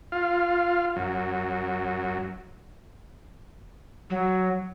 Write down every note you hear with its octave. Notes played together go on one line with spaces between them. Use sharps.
F4
F#2
F#3